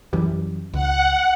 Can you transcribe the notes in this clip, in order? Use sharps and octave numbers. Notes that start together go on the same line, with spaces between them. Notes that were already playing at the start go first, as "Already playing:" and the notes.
F#2 E3 G3
C#2 F#5